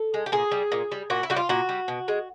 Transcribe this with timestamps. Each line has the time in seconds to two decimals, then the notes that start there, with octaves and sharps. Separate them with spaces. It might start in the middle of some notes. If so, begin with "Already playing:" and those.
Already playing: A4
0.14 G#3
0.26 G4
0.32 A#2 G#4
0.52 G3
0.72 A#2
0.92 G3
1.10 A#2 F#4
1.23 E4
1.30 G3 F#4
1.36 F4
1.49 A#2 F#4
1.69 G3
1.88 B2
2.08 G#3